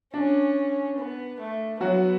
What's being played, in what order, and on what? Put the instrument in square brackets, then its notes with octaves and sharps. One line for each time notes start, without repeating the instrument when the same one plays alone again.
[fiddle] C#4 [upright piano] D4
[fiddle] B3
A3
[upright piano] F#3 F#4 [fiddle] B3